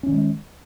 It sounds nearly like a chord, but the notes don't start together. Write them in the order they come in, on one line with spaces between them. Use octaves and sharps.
C#4 D#3 G#3